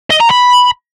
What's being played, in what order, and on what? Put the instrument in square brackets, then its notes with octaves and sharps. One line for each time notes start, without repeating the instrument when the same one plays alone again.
[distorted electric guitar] D#5
A#5
B5